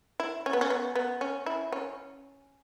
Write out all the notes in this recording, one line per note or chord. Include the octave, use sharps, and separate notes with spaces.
E4
C#4
B3
C#4
B3
B3
C#4
E4
C#4